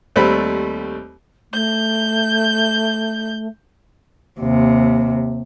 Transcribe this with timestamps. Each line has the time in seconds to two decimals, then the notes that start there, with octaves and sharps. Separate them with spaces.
0.16 D#2 G3 A3 C4 B5
1.52 A3 G6
4.40 D#2 C3